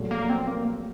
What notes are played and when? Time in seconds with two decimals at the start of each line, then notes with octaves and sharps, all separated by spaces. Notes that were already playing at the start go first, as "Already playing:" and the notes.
Already playing: A#1 A#2 F#3 A3
0.11 A#3
0.29 C4
0.47 A#3